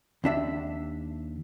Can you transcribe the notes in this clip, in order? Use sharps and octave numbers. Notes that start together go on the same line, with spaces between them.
D#2 D4 E5